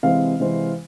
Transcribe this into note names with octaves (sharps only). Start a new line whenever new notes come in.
C3 E3 G#3 C4 F5
C3 E3 G#3 C4